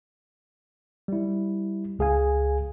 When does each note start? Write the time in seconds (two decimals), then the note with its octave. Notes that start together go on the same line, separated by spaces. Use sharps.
1.08 G3 E4
1.99 C#2 G#4 F5 G#5